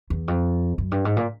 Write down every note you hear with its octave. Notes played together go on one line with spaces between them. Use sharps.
E2
F2
F#2
G2
G#2
A#2